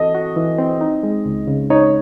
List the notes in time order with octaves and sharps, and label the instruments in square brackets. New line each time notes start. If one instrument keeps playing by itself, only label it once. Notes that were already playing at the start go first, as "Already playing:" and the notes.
Already playing: [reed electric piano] E3 C4 F#4 A4 [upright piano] D#5
[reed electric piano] F#4
E3
C4
D#4
G#3
C#2
C#3
[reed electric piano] D#4 [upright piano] C#5